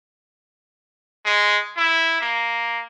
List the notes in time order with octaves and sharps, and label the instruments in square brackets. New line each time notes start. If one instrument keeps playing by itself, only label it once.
[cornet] G#3
E4
A#3